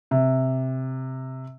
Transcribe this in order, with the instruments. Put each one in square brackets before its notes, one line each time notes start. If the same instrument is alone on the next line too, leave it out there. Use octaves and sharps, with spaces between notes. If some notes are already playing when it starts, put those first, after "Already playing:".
[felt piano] C3